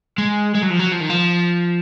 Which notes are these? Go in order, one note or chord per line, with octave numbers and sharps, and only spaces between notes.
G#3
G#3
F#3
F3
F#3
F3
D#3
F3